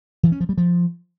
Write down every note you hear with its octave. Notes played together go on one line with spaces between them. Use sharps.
E3
C#4
F3
G3
F3